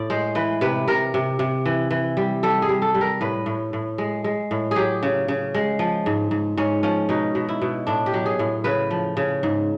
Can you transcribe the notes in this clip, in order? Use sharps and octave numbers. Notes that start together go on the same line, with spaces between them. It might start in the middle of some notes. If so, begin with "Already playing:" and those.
Already playing: A2 D5
G#3 C5
E3 B4
C3 B4
C3 A#4
C3
C3
E3
E3
G3
G3 A4
G#4
G3
A4
G3
A#4
A2 B4
A2
A2
G#3
G#3
A2
F#3 G4 G#4
C#3
C#3
G#3
F3
G#2
G#2
G#2 C#4
F3 C#4
B2 D#4
B2
E4
B2
A2 D4
G4
F#3
G#4
A2
C#3 B4
F3
C#3
G#2